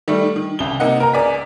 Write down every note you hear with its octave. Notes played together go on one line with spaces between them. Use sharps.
D#3 G3 A3
D#3
C2 C#3 G7
C3 A#3 D#4 D#5 F#5
A#4 A#5
C#2 A#4 D5 G#5 B6